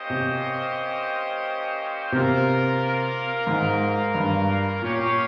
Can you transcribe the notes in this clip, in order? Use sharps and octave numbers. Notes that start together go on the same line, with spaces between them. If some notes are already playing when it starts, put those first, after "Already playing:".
Already playing: A#3 C#4 G4 C5 D#5
C3
C3 A#3 F4 A#4
G#2
G2
A#2 C#4 G4 C#5 F5